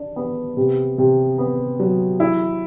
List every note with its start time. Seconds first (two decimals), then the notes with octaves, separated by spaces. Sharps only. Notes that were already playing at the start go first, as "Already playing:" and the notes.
Already playing: D4
0.16 B3
0.57 C3
0.98 C3
1.38 B3
1.80 F#3
2.20 E4